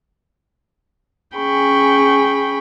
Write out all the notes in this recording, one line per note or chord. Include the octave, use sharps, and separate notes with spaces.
C#4 G#4 G5 B5 C#6